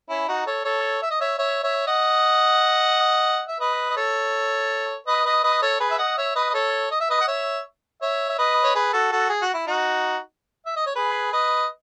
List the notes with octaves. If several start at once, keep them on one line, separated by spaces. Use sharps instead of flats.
C#4 E4
D#4 F#4
A4 C#5
A4 C#5
E5
D#5
C#5 E5
C#5 E5
C#5 E5
D#5 F#5
E5
B4 D#5
D#5
A4 C#5
B4 D#5
B4 D#5
B4 D#5
A4 C#5
G#4 B4
E5
D#5 F#5
C#5 E5
B4 D#5
D#5
A4 C#5
D#5
E5
B4 D#5
F#5
C#5 E5
C#5 E5
E5
B4 D#5
C#5
G#4 B4
F#4 A4
F#4 A4
G#4
F#4
E4
D#4 F#4
E5
D#5
C#5
G#4 B4
B4 D#5